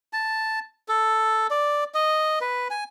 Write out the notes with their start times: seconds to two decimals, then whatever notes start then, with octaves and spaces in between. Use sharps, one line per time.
0.13 A5
0.88 A4
1.51 D5
1.94 D#5
2.41 B4
2.70 G#5